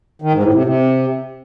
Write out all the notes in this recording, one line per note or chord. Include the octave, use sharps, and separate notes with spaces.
D#3
G#2
A2
C3
C3